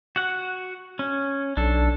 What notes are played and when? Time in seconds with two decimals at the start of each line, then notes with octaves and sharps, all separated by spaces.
0.16 F#4 F#5
0.99 C#4
1.57 B1 D4 A4